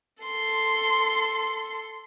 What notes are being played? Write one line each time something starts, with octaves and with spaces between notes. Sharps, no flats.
A4 C6